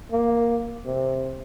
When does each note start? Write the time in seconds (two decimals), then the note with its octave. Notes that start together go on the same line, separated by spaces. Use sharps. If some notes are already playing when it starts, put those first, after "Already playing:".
0.12 A#3
0.86 C3